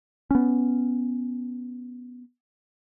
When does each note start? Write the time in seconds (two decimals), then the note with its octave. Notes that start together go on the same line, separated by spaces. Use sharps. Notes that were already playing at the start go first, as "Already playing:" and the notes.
0.31 B3 C#4